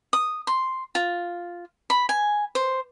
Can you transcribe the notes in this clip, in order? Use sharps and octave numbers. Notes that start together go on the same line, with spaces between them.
D#6
C6
F4
B5
G#5
C5